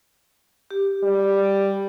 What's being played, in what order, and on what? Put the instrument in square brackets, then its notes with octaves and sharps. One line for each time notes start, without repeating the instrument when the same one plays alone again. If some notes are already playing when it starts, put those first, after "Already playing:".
[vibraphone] G4
[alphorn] G3